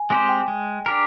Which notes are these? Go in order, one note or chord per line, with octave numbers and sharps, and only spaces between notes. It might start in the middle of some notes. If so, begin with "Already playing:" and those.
Already playing: G#5
G#3 C4 G4 C5 G#5
G5
G#3
D4 G4 A#4